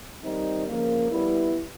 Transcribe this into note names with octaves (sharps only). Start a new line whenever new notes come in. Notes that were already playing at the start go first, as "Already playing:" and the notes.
D#3 G3 C4 D#4
C#3 F3 A#3
G3 B3 E4